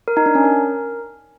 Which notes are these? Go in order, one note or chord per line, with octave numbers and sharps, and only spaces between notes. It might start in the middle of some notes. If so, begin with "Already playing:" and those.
A#4
D#4
D4
C#4
A#4